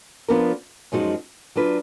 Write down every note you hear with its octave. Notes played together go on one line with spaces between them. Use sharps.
F3 B3 D4 F4 A#4
F#2 F3 G#3 D#4 F#4
F#3 D4 F4 B4